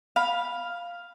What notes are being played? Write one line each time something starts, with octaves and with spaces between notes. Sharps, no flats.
F5 B5